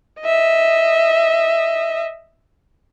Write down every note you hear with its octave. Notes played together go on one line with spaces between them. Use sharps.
D#5 E5